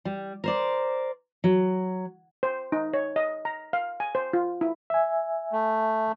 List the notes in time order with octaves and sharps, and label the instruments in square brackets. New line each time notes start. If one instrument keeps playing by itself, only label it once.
[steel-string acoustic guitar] G3
A#4 C5 D5
F#3
[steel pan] C5
D#4
C#5
D#5
A#5
F5
G#5
C5
F4
E4
[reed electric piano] E5 G#5
[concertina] A3